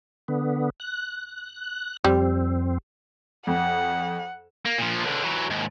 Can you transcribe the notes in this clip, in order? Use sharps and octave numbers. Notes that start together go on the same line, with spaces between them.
D3 B3
F#6
F2 G3 C4
F2 F#5
A#3
A#2 F3
C#2 D3
E3 F#3
D#2 G#2